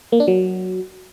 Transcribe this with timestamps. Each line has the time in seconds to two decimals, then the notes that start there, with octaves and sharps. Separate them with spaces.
0.12 A#3
0.20 D4
0.28 F#3